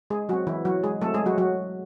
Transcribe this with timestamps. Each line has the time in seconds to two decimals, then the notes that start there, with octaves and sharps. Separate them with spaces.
0.10 G#3 G#4
0.29 F#3 F#4
0.33 C4
0.47 E3 E4
0.65 F#3 F#4
0.83 G#3 G#4
1.01 F#3 A3 C4 A4
1.14 G#3 G#4
1.26 F#3 F#4
1.38 F#3 F#4